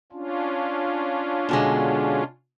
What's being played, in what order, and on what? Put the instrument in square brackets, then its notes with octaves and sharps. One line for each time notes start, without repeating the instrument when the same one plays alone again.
[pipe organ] C#4 D4 F4
[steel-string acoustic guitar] B2 D3 G#3